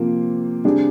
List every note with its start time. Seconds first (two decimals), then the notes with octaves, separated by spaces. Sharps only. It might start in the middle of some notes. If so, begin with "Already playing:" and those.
Already playing: C3 F3 A#3 F4
0.65 C3 G3 D4 G#4